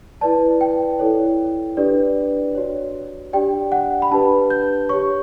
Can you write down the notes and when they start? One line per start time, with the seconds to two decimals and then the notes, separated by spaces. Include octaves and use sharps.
0.21 E4 B4 D5 A5
0.61 G5
0.99 E4 A4 C#5
1.77 D4 G4 B4 D5
2.55 F#4 C#5
3.33 D4 G4 D5 G5
3.72 F#5
4.02 B5
4.11 D4 G4 B4 A5
4.50 G6
4.89 G4 C#5 C#6